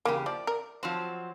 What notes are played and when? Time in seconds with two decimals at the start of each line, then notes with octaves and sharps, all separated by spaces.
0.05 E2 C#3 A#3 G4
0.26 F3 D5
0.47 A#4
0.83 F3 F#3 C4